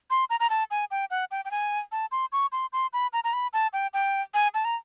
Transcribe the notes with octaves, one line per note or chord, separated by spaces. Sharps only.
C6
A#5
A#5
A5
G#5
G5
F#5
G5
G5
G#5
A5
C6
C#6
C6
C6
B5
A#5
A#5
B5
A5
G5
G5
G#5
A5
A#5